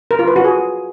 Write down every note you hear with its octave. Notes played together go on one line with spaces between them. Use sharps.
A#4
F4
B4
F#4
G#4